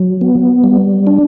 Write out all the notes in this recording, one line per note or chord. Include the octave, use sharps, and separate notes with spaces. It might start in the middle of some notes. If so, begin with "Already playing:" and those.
Already playing: F#3
B3
G3
D4